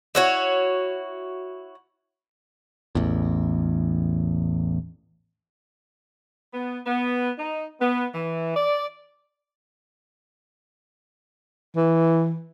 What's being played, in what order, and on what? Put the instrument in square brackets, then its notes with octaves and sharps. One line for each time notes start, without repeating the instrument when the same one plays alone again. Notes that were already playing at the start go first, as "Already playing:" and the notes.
[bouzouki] E4 F#4 C#5
[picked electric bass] A1 E2
[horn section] B3
B3
D#4
B3
E3
D5
[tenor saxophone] E3